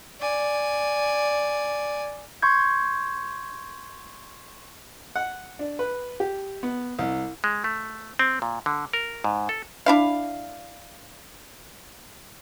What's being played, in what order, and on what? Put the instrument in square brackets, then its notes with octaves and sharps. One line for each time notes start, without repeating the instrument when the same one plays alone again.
[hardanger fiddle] D5 G#5
[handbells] C6 C#6 G6 G#6
[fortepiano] F#5
D4
B4
G4
B3
C2
[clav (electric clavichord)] G#3
A3
C4
A#2
D3
A#4
G#2
A4
[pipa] D4 E4 F5